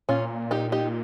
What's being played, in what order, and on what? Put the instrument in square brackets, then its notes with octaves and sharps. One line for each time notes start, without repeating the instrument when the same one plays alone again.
[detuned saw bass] A#2 [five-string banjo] C#4 F4
[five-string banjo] D#4 G4
D#4 G4